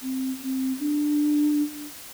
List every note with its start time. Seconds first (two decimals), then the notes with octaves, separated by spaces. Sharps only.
0.02 C4
0.42 C4
0.80 D4